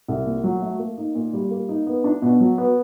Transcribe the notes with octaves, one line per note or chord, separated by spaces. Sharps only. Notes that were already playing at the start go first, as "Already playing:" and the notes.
C2
A#2
F#3
A3
A#3
D#4
A#2
G3
A#3
D#4
B3
D4
B2
F#3
B3